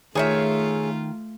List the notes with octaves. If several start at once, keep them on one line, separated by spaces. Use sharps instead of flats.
D#3 A3 F4 G#4 C#5 E5